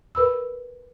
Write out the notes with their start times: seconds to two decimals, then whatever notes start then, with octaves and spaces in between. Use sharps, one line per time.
0.15 A#4 B4 B5 E6